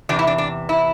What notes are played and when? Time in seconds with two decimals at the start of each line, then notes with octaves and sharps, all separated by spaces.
0.09 E2 C3 E3 D4
0.19 E4
0.27 D4
0.38 D4
0.69 E4